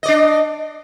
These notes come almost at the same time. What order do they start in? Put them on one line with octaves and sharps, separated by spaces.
D#5 D5 D4